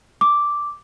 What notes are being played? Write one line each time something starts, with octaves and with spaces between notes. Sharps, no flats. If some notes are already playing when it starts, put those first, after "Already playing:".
D6